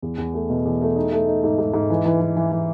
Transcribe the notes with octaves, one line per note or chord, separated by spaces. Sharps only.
E2
E2
A3
B2
E2
A3
D#4
A3
D#4
G#2
G#2
G#2
E3
E3
E3
E3
E3